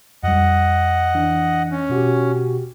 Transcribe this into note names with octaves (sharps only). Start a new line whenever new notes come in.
F2 G3 D#5 F#5
E3 D4
C#4
B2 F#4 G4